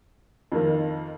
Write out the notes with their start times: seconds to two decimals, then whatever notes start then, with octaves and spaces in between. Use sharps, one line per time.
0.52 F2 D#3 A#3